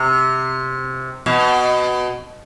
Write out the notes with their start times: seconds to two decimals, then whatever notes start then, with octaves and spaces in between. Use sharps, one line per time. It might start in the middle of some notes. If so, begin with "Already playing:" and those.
Already playing: C3
1.26 B2